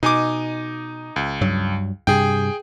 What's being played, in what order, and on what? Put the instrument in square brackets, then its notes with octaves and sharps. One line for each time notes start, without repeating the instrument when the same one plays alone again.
[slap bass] B2 [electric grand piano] D#4 G#5 D6
[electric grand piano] C#2
[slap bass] G2 F#3
[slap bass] G2 C3 [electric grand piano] G#4 G5